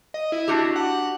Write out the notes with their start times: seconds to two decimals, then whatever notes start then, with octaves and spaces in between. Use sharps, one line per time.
0.14 D#5
0.32 E4
0.48 D4 F#4 G4
0.76 F#5